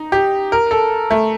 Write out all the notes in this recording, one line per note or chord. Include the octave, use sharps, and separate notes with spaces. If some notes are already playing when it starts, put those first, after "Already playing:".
Already playing: D#4
G4
A#4
A4
A3